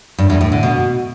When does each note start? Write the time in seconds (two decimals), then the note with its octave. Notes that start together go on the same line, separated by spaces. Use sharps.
0.18 G2
0.30 E2
0.41 A2
0.52 D3
0.63 B2